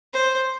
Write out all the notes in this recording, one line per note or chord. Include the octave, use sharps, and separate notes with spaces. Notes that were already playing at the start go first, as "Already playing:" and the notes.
C5